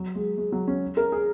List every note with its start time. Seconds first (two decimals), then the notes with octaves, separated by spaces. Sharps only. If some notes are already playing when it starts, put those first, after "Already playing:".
Already playing: F#3
0.15 G#3
0.38 G#3
0.52 F#3
0.68 C#4
0.97 A#4
1.12 G#4